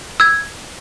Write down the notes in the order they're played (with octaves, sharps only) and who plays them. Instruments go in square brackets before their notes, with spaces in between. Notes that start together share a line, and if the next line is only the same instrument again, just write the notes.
[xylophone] E6 G#6